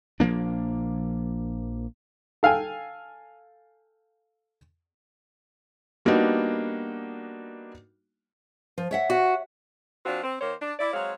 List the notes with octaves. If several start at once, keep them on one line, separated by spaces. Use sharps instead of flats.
A#1 F3 A#3 D4
A4 F5 G5 G#5
G3 A#3 B3 D4 D#4 F#4
F3
C#5 E5 F#5
F#4
F3 C4 D4 F4 F#4
C4
D#3 A#3 C5 C#5
D4
E4 D5
F#3 G#3 C4 C#5 F5